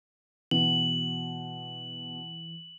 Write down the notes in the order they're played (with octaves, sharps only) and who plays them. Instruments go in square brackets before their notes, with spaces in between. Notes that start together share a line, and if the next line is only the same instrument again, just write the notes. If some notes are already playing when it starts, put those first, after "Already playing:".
[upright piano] B2 [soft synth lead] E3 [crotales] F#7